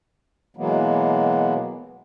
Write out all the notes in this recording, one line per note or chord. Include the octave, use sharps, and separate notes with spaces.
B2 E3 F#3 G#3 A#3 B3